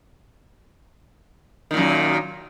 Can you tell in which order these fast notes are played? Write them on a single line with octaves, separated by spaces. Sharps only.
D#3 A#2 F#2